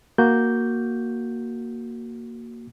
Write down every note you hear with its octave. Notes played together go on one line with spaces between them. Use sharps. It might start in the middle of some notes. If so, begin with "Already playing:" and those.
A#3 F#4 G6